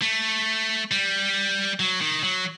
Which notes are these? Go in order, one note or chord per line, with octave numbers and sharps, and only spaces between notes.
A3
G3
F#3
D#3
F#3